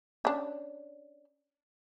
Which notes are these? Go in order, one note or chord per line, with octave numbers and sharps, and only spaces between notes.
C#4 D4